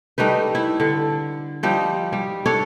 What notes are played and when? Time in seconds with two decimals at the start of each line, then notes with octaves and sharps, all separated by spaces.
0.18 G3 A3 D#4 B4
0.55 E4
0.80 D3
1.63 F3 G3 D#4
2.13 G3
2.46 D4 A4 C#5